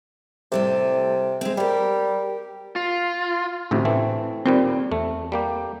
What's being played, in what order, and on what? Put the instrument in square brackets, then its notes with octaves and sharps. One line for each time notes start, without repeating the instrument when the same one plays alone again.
[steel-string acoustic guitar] A2 G3 A4 [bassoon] C3
[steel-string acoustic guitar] G#3 C4
[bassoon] G3 [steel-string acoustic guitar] G4 A#4
[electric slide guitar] F4
[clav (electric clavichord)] A1 D2 C3 [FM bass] A2
[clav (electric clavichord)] E3 A3 C4
[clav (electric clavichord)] D#2 A#2 G3 [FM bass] C4
[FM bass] E2 [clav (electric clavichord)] A3
[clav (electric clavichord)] G3 A#3 G4